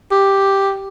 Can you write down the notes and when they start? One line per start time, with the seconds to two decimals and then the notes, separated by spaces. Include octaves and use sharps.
0.11 G4